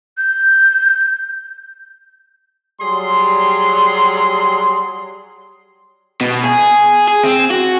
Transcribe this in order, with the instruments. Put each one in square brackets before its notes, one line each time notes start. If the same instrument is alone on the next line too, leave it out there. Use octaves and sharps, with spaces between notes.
[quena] G6
[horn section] F#3 G3 G#4 C6
[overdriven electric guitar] B2
G#4
G#4
C4
F#4